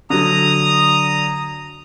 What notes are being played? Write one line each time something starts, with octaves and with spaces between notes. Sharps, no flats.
D3 F#3 A#5 D#6